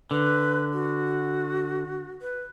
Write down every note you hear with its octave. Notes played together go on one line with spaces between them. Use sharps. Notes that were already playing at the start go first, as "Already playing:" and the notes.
D3 B4
F#4
B4